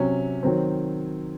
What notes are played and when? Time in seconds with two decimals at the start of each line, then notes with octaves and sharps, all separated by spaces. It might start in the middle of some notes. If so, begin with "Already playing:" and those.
Already playing: C3 F#3 C#4
0.43 D#3 F#3 C4